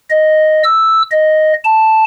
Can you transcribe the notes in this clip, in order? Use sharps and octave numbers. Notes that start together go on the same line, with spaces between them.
D#5
E6
D#5
A5